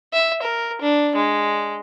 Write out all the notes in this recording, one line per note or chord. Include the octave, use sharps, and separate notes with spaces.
E5
A#4
D4
G#3